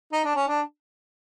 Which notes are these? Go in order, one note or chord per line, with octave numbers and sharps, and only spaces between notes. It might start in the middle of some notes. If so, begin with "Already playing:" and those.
D#4
D4
C#4
D4